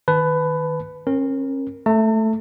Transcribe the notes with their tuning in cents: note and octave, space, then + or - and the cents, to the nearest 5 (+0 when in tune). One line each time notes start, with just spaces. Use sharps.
D#3 +0 B4 +15 A5 -20
C#4 -40 A#4 +0
A3 +0 A5 +45